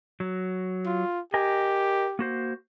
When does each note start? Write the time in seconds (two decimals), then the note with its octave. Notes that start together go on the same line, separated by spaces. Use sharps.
0.20 F#3
0.86 F4
1.34 G4 A#4 D#5 G#5
2.19 A#3 F#4 C5